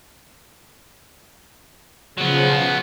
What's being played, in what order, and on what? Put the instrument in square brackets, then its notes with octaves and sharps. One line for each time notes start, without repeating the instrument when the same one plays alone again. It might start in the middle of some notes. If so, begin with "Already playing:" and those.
[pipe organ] C#3 F3 [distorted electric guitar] F#3 B3